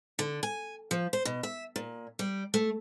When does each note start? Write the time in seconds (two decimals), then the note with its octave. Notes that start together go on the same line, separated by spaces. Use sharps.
0.19 D3
0.43 G#5
0.91 F3
1.13 C5
1.25 B2
1.43 E5
1.76 A#2
2.19 G3
2.54 A3